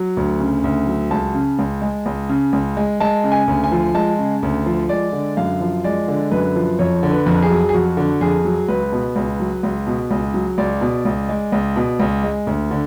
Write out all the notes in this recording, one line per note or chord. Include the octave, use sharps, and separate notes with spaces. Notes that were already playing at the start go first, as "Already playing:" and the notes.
Already playing: F#3
D2
C#3
D2
F#3
C#2 A5
C#3
C#2
G#3
C#2
C#3
C#2
G#3
G#3 A5
C#3
G#5
D2
G#5
F3
G#3 A5
C#3
D2
F3
G#3 D5
D3
F#2 F5
F3
G#3 D5
D3
F#2 B4
F3
F2 C#5
D3
B4
F2
G#4
F#3
G#4
F2 F#4
D3
F2 G#4
F#3
C#2 B4
B2
C#2
F#3
C#2
B2
C#2
F#3
C#2 D5
B2
C#2
G#3
C#2
B2
C#2
G#3
D2
D3